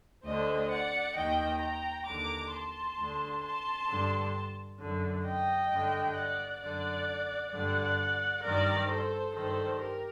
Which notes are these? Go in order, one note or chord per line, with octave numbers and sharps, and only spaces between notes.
D2 D3 C5 D#5
D5 F#5
D#2 D#3 D#5 G5
G5 A#5
D#2 D3 A#5 D6
A5 C6
D2 D3
A5 C6
G2 D3
F#2 D3
D#5 G5
G2 D3
D5 F#5
F#2 D3 D5 F#5
G2 D3 D5 F#5
G2 D#3 A#4 D5
A4 C5
G2 D#3 A4 C5
G4 A#4